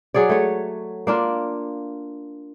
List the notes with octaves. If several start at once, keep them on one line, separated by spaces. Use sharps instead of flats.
F#3 G#4 C#5 D5
A3 C#5
A#3 D4 F4